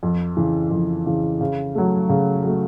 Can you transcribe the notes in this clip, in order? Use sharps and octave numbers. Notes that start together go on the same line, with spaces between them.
F2
C#3 E3
F2
C#3 E3
C#3
F#3 A3
C#3
F#3 A3